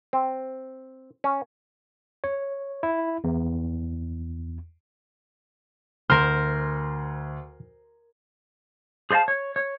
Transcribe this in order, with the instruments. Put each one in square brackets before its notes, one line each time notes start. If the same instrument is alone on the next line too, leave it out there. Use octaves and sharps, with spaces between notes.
[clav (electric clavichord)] C4
C#4
[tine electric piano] C#5
E4
E2
[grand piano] D2 [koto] A#4 C5 [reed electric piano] F6
[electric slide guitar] G#4 C5 D5 F5 A5
C#5
C#5